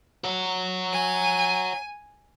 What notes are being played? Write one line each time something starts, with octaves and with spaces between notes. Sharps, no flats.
C#5 F#5
G#5